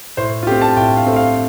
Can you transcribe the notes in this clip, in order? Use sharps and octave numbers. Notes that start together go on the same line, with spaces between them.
A2 C5
F4
A3 C4 G4
A5
A2 G5
F5
A3 C4
F5